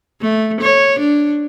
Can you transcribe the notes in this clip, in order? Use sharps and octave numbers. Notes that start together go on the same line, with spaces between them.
A3
C#5
D4